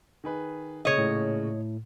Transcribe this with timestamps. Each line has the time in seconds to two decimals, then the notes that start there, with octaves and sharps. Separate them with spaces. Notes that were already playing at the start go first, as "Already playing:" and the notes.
0.24 D#3 G#4 B4
0.85 A#2 C#3 G#3 C#5 D#5
0.98 A2